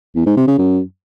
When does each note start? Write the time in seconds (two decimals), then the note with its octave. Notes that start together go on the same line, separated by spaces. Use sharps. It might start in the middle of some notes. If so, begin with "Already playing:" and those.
0.15 E2
0.26 G#2
0.37 C3
0.47 C#3
0.58 F#2